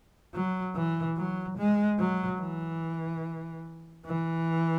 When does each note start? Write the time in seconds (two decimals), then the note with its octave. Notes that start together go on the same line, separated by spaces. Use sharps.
0.34 F#3
0.75 E3
1.17 F#3
1.58 G#3
1.99 F#3
2.40 E3
4.06 E3